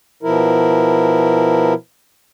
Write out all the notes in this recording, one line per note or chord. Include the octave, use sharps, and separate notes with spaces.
B2 F3 E4 A#4